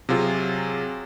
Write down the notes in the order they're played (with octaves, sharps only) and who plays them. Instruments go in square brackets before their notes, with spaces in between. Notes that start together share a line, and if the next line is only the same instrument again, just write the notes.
[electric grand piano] C3 F#3 F4 G#4